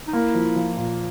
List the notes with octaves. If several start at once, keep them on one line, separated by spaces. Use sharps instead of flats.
D#4
A#3 E4
F3
F3
A#2